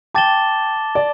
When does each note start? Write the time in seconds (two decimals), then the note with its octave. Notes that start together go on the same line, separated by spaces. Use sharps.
0.14 G5 A5 D6 A6 E7 G7
0.95 D5